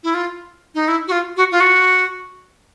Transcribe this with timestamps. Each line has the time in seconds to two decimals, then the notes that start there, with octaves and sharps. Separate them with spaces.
0.04 E4
0.14 F4
0.75 D#4
0.88 E4
1.08 F#4
1.12 F4
1.37 F#4
1.51 F4
1.61 F#4